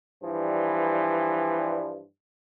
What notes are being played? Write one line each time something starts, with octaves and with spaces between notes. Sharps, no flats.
G2 E3 F3 G3